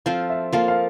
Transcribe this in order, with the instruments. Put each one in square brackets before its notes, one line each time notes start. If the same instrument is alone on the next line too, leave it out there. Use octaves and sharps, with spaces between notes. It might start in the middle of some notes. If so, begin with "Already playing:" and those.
[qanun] F3 C4 F4 A4 [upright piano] F5
[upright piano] E5
[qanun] F3 A#3 F4 A4 [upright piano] F5
[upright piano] F5